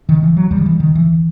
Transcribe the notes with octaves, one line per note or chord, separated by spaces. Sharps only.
D#3
E3
F#3
D#2 G3
D#3
E3
D#3
E3